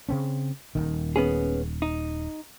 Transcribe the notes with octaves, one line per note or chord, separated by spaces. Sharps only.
C#3 C4 C#4
D#1 C2 D#3
B3 C#4 G#4
D#4